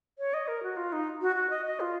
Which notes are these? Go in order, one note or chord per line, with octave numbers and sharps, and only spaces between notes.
C#5
D#5
A#4
F#4
F4
D#4
F#4
F#4
D#5
D#5
F4